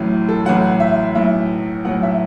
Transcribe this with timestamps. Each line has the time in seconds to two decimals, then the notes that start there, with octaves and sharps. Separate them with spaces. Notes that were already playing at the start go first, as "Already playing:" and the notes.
Already playing: A1 A2 F#3
0.29 A4
0.45 A1 A2 F#3 F#5
0.80 E5
1.15 B1 A2 F#3 E5
1.85 B1 A2 F#3 F#5
2.03 E5